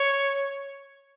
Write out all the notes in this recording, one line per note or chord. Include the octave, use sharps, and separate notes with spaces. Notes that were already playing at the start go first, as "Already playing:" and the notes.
Already playing: C#5